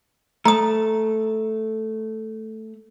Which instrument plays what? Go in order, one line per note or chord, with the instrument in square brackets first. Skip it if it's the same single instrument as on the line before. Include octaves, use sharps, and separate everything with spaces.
[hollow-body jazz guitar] A3 [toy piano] A#5 D#6